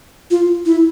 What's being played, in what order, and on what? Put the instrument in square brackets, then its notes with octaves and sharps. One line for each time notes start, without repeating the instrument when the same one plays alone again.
[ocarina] F4
E4